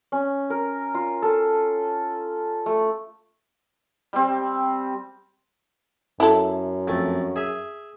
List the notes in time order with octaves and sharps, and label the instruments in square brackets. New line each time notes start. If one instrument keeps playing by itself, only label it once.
[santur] C#4
A#4
F4
A4
A3
[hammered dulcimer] G3 C4
[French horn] F#2 [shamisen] E4 A4
[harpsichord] F2 A3
G#4 E5